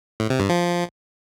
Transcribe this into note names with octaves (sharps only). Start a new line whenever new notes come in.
A2
C3
G2
F3